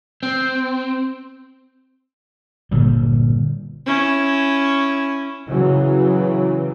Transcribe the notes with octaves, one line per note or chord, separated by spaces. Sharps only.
C4
G1 A#2 D3 G3
C#4 E4
C#3 E3 F#3